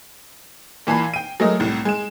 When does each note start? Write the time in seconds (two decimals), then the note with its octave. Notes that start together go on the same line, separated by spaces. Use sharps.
0.87 A#2 E3 A5 B5 C7
1.14 G5 D#7
1.40 F#3 G#3 A3 A#4 D#5
1.60 C2 A2
1.85 G#3 E7